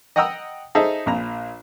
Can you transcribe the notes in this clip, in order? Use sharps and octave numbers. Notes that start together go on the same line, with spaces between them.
D#5 F#5 G5 A#5 D#6 E6
D#4 G#4 A4 C5 E5
A#1 A#2 A#5